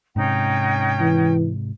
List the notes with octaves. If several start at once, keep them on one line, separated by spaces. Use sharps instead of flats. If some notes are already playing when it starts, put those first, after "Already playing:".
G#2 C3 C#4 D#4 G5
E3